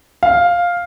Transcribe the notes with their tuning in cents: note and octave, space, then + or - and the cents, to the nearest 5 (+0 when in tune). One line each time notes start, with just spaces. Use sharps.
F5 +5